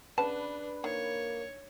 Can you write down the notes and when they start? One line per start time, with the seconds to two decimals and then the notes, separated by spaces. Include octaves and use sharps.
0.18 C#3 D4 B4 F#5 A5
0.84 D#3 A#3 C#5